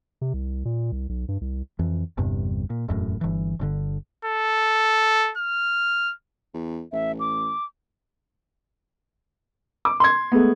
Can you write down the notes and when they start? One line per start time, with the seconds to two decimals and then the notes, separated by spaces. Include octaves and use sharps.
0.21 C3
0.34 C2
0.65 A#2
0.92 C2
1.09 B1
1.28 G2
1.41 C2
1.79 F2 E3
2.17 G1 E2 G2 C3
2.70 A#2
2.88 E1 F#2 A2
3.21 G1 E3
3.59 G1 B2 D3
4.25 A4
5.37 F6
6.54 E2
6.93 A1 E5
7.20 D6
9.85 D6
10.00 C6 G#6
10.32 G#3 A3 B3